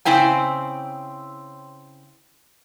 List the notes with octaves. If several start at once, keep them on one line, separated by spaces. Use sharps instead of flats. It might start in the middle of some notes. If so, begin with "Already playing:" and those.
C#3 C4 E4 G5 G#5